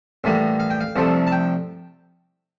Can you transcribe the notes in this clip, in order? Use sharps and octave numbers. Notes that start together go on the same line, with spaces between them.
A1 A2 G3 A#3
F5
G5
F5
C2 C3 F3 A3
A5
G5